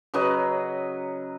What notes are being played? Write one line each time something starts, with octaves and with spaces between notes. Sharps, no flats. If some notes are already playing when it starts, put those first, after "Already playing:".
C#3 F#3 B4 D#5